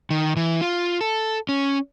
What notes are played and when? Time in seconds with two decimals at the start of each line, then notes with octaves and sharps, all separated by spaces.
0.10 D#3
0.36 E3
0.61 F4
1.01 A4
1.49 C#4